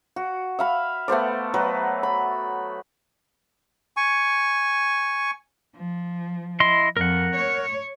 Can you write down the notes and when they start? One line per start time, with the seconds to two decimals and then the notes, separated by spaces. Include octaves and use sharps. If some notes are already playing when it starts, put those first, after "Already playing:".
0.16 F#4
0.59 E5 F5 B5
1.08 A3 B3 C5 D5
1.54 F#3 B4
2.03 B5
3.97 G#5 C#6
5.76 F3
6.60 E4 D#5 C6
6.97 F2 A#4 F#5
7.35 C#5